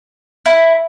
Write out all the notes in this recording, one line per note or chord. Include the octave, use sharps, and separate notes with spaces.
E4